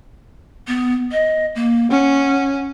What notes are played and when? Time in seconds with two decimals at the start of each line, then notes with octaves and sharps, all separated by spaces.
0.68 B3
1.12 D#5
1.55 A#3
1.91 C#4 F#5